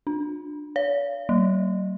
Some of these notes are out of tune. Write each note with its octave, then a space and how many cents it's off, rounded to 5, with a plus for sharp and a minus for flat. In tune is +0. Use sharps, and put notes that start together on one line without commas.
D4 +15
C#5 +45
F#3 +45